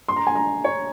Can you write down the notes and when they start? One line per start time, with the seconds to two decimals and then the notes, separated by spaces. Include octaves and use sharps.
0.08 C6
0.16 A#5
0.27 G#5
0.35 A#5
0.64 C#5